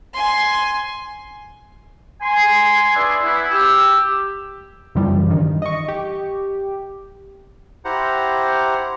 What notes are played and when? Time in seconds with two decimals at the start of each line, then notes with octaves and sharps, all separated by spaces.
0.14 G#5 C6
2.22 G#5 C6
2.95 D4 G#4 B4 D5 E5
3.22 B3 E4
3.51 G4 E6
4.95 F#2 C#3 E3 F3 G3
5.30 G2 D#3
5.62 D#5 C#6
5.88 G4
7.85 E4 G4 C5 F#5 A#5